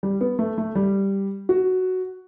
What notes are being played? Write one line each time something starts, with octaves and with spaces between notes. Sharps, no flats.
G3
B3
A3
A3
G3
F#4